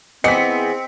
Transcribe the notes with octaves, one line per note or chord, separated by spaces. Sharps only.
E3 B3 C4 G#4 D#5 B6 C#7